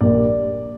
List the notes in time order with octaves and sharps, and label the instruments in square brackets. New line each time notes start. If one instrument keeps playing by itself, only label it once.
[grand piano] A#1 A#2 G3 A#3 D5